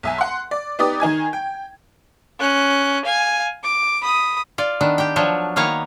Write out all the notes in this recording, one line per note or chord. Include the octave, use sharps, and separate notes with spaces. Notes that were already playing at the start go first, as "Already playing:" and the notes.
B1 E5 G#5
F#5 C6
D5
B3 D#4 G4 D5 D#6
D#3 D#4 G#5 G#6
G5
C#4 F#6
F5 G#5
D6
B5 D#6
F4 D5
D#3 B3 D4
G4 G5
F3 F#3 D4 C#5
D#3 A#3 B3 C#5 F5 A#5